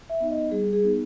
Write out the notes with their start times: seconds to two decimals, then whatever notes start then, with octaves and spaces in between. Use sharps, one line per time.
0.10 E5
0.20 B3 D#4
0.30 D#5
0.51 G3 G#4
0.73 G#4
0.83 B3 D#4